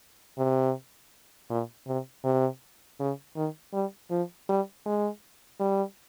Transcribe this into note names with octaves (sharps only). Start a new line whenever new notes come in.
C3
A#2
C3
C3
C#3
D#3
G3
F3
G3
G#3
G3